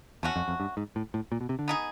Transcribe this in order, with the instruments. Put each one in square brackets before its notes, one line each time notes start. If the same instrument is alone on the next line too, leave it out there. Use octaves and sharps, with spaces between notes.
[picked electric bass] E2 [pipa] A3 C#4 F#4
[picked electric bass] F2
F2
G2
G#2
A2
A2
A#2
B2
C3
D3
[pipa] B3 D#4 G#4